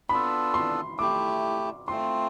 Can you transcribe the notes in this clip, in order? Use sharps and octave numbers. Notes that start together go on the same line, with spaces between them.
B3 D4 F4 A4 B5
C6
A3 E4 G4 D6
A3 C4 F4 C6